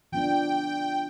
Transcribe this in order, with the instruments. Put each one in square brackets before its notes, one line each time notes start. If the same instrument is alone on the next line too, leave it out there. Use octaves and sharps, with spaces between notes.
[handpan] F3 B3 D4 [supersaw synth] G5